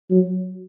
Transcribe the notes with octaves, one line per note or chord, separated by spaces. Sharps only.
F#3